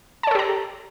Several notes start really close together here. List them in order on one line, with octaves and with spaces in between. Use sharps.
A5 C#5 A4 G4 A#5